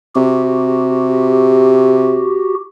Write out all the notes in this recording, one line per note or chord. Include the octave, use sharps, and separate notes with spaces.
C3 F#4 G4